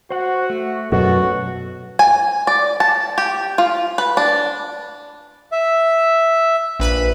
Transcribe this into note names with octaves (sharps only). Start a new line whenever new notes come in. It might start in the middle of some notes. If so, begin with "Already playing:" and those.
F#4 C5 F#5
A3
F#2 B2 F#3 F#4 A4
G#5
D5
A5
G4
F4
B4
D4
E5
A#1 B4 B5